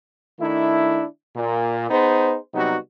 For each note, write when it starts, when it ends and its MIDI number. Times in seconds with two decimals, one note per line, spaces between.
0.40 1.04 51
0.40 1.04 57
0.40 1.04 62
0.40 1.04 64
1.36 1.90 46
1.90 2.37 59
1.90 2.37 63
1.90 2.37 68
1.90 2.37 72
2.54 2.76 48
2.54 2.76 54
2.54 2.76 55
2.54 2.76 59
2.54 2.76 63
2.54 2.76 66